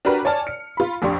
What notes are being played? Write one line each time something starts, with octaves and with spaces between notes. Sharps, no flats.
D4 F#4 G4 A#4 B4 B5
C#5 D5 G#5 A5 F6
C#7
F4 B5
A#1 F2 D4 G4 C6 C#6